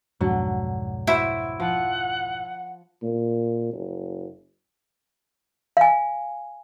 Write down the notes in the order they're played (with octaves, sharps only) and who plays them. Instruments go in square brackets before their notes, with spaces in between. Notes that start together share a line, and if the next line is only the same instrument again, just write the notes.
[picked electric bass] B1 F2 G#2 [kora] D3 F#3
[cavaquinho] E4 [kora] F#4 C5 E5
[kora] F3 [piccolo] F#5
[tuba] A#2
F#1
[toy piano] F5 G#5